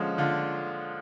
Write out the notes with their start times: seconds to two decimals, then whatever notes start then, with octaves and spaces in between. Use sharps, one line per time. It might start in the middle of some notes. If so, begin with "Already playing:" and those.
Already playing: D3 F3 G#3 C#4 F4
0.18 D3 F4